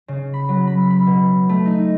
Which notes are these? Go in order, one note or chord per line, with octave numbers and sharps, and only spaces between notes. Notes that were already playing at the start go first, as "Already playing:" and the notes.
C#3
B5
F#3
B5
B5
B2
A3
D#4